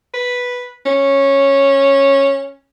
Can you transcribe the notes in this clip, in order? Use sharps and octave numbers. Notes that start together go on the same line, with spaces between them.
B4
C#4